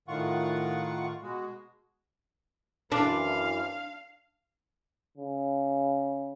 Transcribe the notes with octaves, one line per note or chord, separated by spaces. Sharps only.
A2 D#3 F4 F#5 C#6
B2 G#3 F#4
F#2 E3 D4 F5 C6
C#3